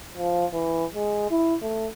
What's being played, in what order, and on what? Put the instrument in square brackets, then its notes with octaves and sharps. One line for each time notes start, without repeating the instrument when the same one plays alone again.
[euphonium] F3
E3
G#3
E4
A3